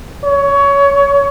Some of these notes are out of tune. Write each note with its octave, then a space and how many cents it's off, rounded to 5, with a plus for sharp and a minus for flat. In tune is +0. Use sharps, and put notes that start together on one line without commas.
C#5 +20